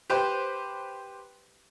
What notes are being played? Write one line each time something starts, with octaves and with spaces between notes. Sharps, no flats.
G4 B4 C5